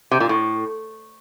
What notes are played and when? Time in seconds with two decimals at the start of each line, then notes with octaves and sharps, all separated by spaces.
0.11 C3
0.20 A#2
0.29 A2